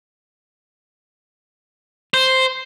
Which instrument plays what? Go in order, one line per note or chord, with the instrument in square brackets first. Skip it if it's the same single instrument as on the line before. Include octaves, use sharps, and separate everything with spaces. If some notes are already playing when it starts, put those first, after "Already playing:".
[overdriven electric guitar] C5